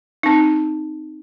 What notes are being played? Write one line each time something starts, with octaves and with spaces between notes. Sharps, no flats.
C4 D#4